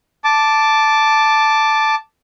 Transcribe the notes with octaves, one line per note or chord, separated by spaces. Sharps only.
A5 D6